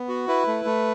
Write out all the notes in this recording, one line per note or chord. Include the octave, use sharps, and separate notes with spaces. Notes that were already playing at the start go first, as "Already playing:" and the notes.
Already playing: B3
F#4
E4 B4
A3
A3